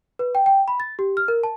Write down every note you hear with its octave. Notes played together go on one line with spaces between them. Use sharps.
B4
G5
G5
B5
A6
G4
F6
A#4
A5